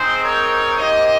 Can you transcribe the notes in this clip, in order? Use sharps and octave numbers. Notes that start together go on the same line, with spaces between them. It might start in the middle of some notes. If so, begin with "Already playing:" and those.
Already playing: G#3 C4 D#4 G#4 C5
A#4 C#5
A#3 D#4 G4 C5 D#5